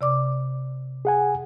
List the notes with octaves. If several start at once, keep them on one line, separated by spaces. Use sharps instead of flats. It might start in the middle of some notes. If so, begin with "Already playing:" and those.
C3 D5 D6
G#4 F#5 G#5